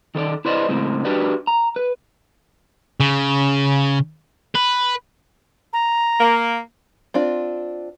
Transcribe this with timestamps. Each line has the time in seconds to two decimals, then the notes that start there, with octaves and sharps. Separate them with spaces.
0.15 D#3 A4 C5 D5
0.45 E4 B4 C5 D5 D#5
0.69 A2 C#3 G#3 C4
1.05 D4 F#4 G4 B4 D5
1.47 A#5
1.76 B4
3.00 C#3
4.55 B4
5.73 A#5
6.20 A#3
7.14 C4 D4 F4